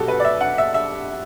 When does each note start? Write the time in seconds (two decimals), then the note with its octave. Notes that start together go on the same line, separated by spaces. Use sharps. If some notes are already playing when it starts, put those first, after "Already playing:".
Already playing: C2 B2 F#3 F#4 G4 A4
0.08 B4
0.20 D5
0.25 E5
0.41 F#5
0.58 E5
0.74 E5